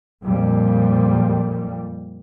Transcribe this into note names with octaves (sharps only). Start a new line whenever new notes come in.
F2 A#2 G3